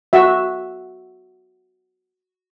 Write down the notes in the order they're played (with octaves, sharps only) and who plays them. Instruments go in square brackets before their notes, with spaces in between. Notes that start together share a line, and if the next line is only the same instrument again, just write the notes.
[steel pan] F#4 E5